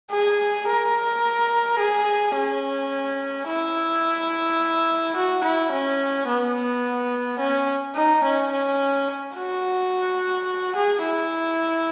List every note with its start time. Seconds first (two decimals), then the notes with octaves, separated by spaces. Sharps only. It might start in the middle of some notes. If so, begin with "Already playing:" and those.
0.12 G#4
0.68 A#4
1.79 G#4
2.35 C#4
3.48 E4
5.16 F#4
5.44 E4
5.72 C#4
6.28 B3
7.40 C#4
7.95 D#4
8.24 C#4
8.51 C#4
9.36 F#4
10.76 G#4
11.04 E4